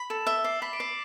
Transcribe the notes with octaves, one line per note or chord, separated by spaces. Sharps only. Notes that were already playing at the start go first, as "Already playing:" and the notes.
Already playing: B5
A4 E7
E5 G7
D5 C7
B5 B6
D7
D5 C7